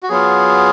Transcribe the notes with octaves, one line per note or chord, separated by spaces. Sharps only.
F#4
F#3 B3 F4 G#4